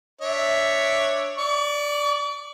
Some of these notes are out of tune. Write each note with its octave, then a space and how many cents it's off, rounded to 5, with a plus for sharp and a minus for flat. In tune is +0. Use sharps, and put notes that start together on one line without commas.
D4 +0 C#5 +0 E5 +0
D5 +0 C#6 +45